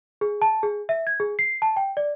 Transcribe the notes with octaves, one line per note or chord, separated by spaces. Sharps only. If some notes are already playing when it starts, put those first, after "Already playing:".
G#4
A5
G#4
E5
G#6
G#4
C7
A5
G5
D5